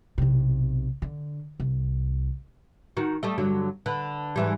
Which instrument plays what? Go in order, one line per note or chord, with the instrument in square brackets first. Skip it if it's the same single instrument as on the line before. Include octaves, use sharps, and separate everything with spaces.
[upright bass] B1 C3
D3
C2
[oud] D#3 F#4
G3 A3 D#5
G2 D3 F#3
D3 B4
G#2 E3 G3